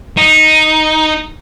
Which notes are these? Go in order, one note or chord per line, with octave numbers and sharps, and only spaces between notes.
D#4